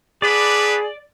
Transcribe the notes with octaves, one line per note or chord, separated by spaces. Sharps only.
B3 D4 G#4 B4 D5